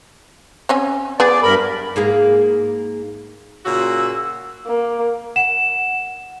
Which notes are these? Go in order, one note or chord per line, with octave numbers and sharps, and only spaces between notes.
C4 C#4 G#5
B3 G#4 D5
G2 A#4 B5
G#2 A#3 G#4
A#2 C#3 F#4 E6
A#3
F#5 E7